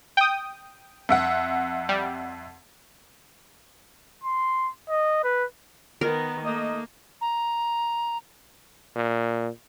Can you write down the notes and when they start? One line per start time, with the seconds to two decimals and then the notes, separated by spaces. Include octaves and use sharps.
0.17 G5 D#6
1.09 F2 E5 F#5
1.89 G3
4.24 C6
4.89 D#5
5.24 B4
6.01 D#3 B3 A#4
6.45 A3 A#3 D#4 D#5
7.21 A#5
8.96 A#2